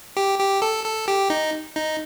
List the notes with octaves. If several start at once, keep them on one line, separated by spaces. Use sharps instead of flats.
G4
G4
A4
A4
G4
D#4
D#4